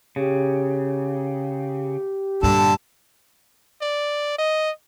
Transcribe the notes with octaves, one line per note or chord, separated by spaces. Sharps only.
C#3 G4
G2 A#2 D3 A4
D5
D#5